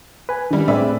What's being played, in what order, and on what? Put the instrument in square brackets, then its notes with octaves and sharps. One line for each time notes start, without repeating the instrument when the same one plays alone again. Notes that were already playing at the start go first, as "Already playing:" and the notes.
[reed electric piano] B4 G#5
[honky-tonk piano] D3 G3 [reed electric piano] D#3 E4
[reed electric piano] A2 C4 G#4 [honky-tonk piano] B4 D5 E5